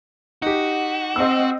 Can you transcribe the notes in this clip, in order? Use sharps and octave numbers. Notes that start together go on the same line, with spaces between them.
D#4 F#4 G4
C4 D#5 E6